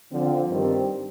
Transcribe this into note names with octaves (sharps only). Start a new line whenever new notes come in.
D3 F3 C4
G2 D#3 G3 C4 G4